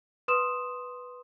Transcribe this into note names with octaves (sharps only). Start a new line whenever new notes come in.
B4 C6 D#6 E7